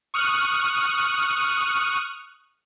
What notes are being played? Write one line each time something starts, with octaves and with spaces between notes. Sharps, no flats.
C#6 D#6 F6 F#6